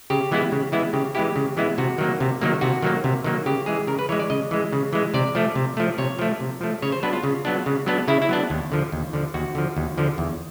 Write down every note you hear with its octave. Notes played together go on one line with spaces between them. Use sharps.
C#3 G4
E3 G#3 B3 E4
C#3
E3 G#3 B3 E4
C#3 G4
E3 G#3 B3 E4 G4
C#3
E3 G#3 B3 E4
C3 F#4
D#3 F#3 A#3
C3
D#3 F#3 A#3
C3 F#4
D#3 F#3 A#3
C3
D#3 F#3 A#3
C#3 G4
E3 G#3 G#4
C#3 A#4
B4
E3 G#3 C#5
D5
C#3 D#5
E3 G#3
C#3
E3 G#3
C3 D5
F3 A3
C3
F3 A3
C3 C#5
F3 A3
C3
F3 A3
C#3 C#5
C5
F#3 B3 D4 B4
F4
C#3
F#3 B3 D4
C#3
F#3 B3 D4
C#3 E4
E4
F#3 B3 D4
D#2
D3 F3
D#2
D3 F3
D#2 F#4
D3 F3
D#2
D3 F3
E2